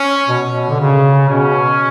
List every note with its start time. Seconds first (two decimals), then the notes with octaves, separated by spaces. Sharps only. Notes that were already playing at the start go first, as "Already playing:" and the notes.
Already playing: C#4
0.28 B2
0.50 B2
0.69 D3
0.80 C#3
1.29 B2 C#4